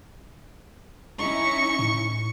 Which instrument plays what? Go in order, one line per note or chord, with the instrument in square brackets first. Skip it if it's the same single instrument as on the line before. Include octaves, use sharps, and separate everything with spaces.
[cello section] C#4 D#4 E4 [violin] C#6
[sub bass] A2